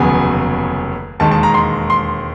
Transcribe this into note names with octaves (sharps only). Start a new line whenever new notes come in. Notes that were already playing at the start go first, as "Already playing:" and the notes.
Already playing: F1 D#2 C#3 F#3 B3 G#5
E1 D#2 D#3 G#3 A5
A5
A#5
C6
C6